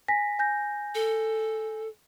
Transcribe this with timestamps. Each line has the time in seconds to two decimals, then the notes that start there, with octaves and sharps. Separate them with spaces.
0.08 G#5 A#6 B6
0.39 G#5 G6 A#6
0.95 A4